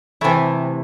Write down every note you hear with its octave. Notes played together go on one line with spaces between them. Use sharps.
C3 E3 A3 E4